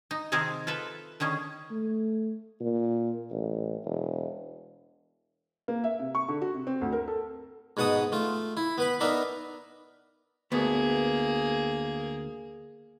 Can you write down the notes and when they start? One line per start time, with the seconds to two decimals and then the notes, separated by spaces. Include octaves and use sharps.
0.11 D#4
0.32 C3 D#3 C4 G#4 A#4 A5
0.67 F4 A4 B4 E5
1.20 D3 D#3 C#4 G#4
1.71 A3
2.60 A#2
3.31 A1
3.85 E1
5.68 A#3
5.84 E5
5.99 C3
6.15 C#6
6.28 D3
6.42 F#4
6.54 C3
6.67 C4
6.81 D2
6.93 A#4
7.08 A4
7.77 G#2 B2 F#5 A5 D#6
8.12 A3 F4
8.57 E4
8.78 B3 B4 B5
9.00 B3 D4 D#4 A#4 E5
10.52 D2 A#3 B3 G#4